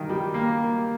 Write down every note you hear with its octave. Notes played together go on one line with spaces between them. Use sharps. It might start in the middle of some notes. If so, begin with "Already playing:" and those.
Already playing: G2 D#3
G3
A#3